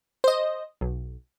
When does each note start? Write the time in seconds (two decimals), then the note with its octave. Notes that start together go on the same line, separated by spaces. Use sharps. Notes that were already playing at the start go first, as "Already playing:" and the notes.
0.24 C5 D#5
0.81 B1